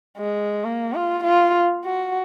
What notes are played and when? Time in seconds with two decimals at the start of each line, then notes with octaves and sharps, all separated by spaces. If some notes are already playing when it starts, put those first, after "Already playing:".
0.18 G#3
0.64 A#3
0.94 F4
1.24 F4
1.85 F#4